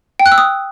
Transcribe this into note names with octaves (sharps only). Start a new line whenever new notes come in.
G5
F#6
E6
D#6